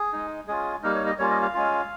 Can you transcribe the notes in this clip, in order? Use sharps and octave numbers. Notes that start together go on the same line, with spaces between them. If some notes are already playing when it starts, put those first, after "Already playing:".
Already playing: G#4
G#3 D#4
G#3 C#4 F4 G#4
G3 A#3 D#4 A#4
C#5
D#5
G3 A#3 C#4 F4 C#5
D#5
F5
G#3 C#4 F4